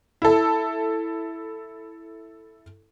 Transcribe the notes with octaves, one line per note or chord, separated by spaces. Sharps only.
E4 A4